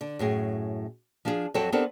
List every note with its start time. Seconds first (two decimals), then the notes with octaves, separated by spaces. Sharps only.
0.01 D3
0.19 F#2 A2 G#4
1.25 F3 D4 F4 F#4 G#4
1.54 F2 F#3 C4 F#4 A4 G5
1.72 B3 C4 D4 G4 A4 A#4